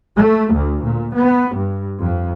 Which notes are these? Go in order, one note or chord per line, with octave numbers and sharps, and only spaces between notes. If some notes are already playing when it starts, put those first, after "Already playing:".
A3
D2
A#2
B3
G2
F2